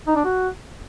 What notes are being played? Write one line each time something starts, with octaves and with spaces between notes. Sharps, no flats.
D#4
D4
F#4